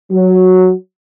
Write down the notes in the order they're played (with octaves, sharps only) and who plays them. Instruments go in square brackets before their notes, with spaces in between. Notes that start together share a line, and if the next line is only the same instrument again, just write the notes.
[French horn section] F#3